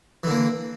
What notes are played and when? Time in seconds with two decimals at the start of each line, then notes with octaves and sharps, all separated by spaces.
0.23 E3
0.27 D3
0.30 A#3